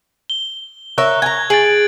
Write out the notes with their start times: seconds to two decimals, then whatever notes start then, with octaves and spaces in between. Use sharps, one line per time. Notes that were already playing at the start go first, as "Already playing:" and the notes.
0.30 G7
0.98 A#4 C#5 E5 F#6
1.22 G#5 A#5 G#6
1.50 G#4 A6 D7 F#7